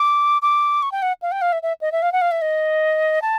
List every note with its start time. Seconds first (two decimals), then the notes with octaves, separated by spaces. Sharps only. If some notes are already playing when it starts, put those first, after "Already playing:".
Already playing: D6
0.42 D6
0.82 C#6
0.92 G5
1.02 F#5
1.22 F5
1.32 G5
1.42 F5
1.52 E5
1.63 E5
1.81 D#5
1.92 E5
2.02 F5
2.12 F#5
2.21 F5
2.31 E5
2.42 D#5
3.22 A5